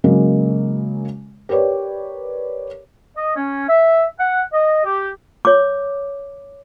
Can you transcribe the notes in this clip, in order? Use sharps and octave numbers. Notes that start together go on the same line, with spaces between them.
C#3 F#3 G#3 A#3
G4 A#4 B4 C#5 D5
D#5
C#4
E5
F#5
D#5
G4
C#5 D6